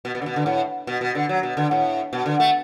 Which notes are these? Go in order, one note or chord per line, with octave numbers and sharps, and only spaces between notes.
B2
B2
D3
B2
D3
A2
B2
B2
D3
F#3
B2
D3
A2
B2
D3
A3